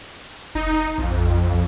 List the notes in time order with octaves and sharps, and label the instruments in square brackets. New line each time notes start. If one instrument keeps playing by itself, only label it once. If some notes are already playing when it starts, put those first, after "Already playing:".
[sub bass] F1 [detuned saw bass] D#4
[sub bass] A#1 [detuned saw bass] F2
[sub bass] A#1